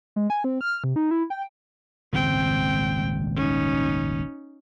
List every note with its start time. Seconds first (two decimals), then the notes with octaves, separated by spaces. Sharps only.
0.16 G#3
0.30 G#5
0.44 C4
0.61 F6
0.84 C3
0.96 D#4
1.11 E4
1.30 G5
2.13 D#1 G#1 C#2 C4 G5
3.36 C#4 D#4